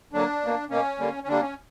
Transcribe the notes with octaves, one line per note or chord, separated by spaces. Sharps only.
D3 F#3 A#3 D4
B2 A#3
B2 A#3 C#4
D3 G3 A#3
C#4
D3 G3 A#3 D4
C#4